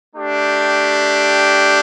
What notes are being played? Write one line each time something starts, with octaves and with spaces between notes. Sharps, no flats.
A3 D4 G4